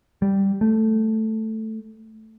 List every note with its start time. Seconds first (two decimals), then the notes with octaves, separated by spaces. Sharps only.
0.22 G3
0.61 A3